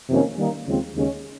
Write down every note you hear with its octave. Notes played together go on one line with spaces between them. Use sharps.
F2 C3 D#3 A#3 C#4
D#3 G3 A#3 D#4
D#2 C#3 F3 G#3 C4
D#2 C#3 G#3 C#4